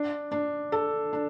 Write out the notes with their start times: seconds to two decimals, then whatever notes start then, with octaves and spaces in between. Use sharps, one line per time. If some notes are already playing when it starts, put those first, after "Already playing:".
Already playing: D4
0.32 D4
0.72 A4
1.13 D4